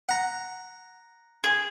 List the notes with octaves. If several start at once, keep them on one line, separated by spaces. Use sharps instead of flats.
F#5 A#5
G#4